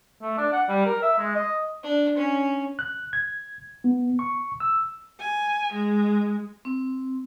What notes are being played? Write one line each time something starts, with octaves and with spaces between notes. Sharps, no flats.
A3
D4
F#5
G3
A#4
E5
G#3
D#5
D4
C#4
F#6
G#6
B3
C#6
E6
G#5
G#3
C4